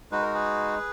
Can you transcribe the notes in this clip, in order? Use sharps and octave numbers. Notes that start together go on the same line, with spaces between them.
G#3 D#4 F#4 B4
A#4
G#4 B4